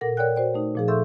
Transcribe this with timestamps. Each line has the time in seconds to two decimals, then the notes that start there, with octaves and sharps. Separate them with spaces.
0.01 A#2 A4 A#4 F#5 A#6
0.17 A#4 C#5 D5 F#5 G5 F#6
0.35 F#4 C5 D5 G5
0.54 A3 D#4
0.75 A#2 F3 G#4
0.88 A4 E5 C6 C#6 E6 G6